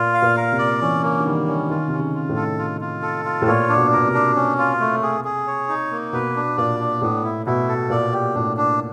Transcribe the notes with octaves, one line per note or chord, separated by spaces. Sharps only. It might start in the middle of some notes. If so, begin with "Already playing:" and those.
Already playing: A#2 F4
F5
A#2
A#4
C3
D5
E3 C#4
A#3
D3
D#3 G3
C#4
D#3 F4
C3 C#4
C#3
F4
A2
A4
F4
F4
A4
F4
A2
A#2 C#5
D4
B2
B2 A#4
C3
D4
C#4
F4
A3
G#4
G#4
C#5
D#4
A#3
B2 B4
D4
A#2 D5
D4
A2 B3
E4
B2 E4
A4
A#2 D5
G4
A2 D4
D4